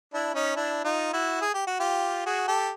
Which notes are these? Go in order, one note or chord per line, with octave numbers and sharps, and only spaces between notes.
D4 E4
C#4 D#4
D4 E4
D#4 F4
E4 F#4
G#4
G4
F#4
F4 G4
F#4 G#4
G4 A4